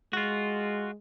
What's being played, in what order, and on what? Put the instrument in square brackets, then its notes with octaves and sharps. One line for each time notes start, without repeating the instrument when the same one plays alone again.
[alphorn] G#3 [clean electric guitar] F4 F#4